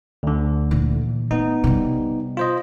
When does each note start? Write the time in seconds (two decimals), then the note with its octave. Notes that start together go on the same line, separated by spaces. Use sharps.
0.23 D2 D3
0.71 A#2 E3
1.31 A3 B3 D#4
1.64 C3 G3
2.37 F4 C5 D#5